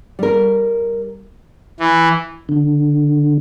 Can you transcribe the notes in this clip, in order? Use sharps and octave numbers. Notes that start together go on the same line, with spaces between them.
G3 A#4
E3
D3